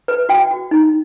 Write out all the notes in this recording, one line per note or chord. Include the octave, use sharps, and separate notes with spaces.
B4
F#4 G5
F#4
D#4